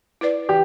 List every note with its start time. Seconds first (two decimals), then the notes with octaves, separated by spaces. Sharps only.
0.21 E4 B4 D5
0.49 E3 G4